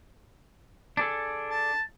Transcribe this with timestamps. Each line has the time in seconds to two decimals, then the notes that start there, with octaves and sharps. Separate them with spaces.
0.97 D4 G#4 A4
1.51 A5